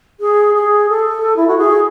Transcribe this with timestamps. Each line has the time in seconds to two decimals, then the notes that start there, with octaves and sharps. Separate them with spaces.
0.20 G#4
0.55 G#4
0.89 A4
1.36 E4
1.48 F#4
1.58 G#4